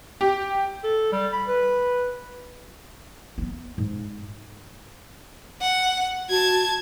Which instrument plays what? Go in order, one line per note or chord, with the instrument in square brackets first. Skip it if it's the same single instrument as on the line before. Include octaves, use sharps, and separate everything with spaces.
[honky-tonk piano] G4
[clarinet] A4
G3
B5
B4
[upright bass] B3 C4
G#2
[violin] F#5
[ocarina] F#4 [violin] A5 G#6